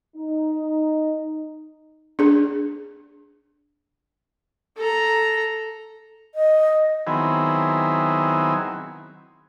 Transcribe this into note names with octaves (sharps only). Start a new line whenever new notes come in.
D#4
D4 G#4
A4 A#5
D#5
D#3 F#3 B3 C4 E4 G#4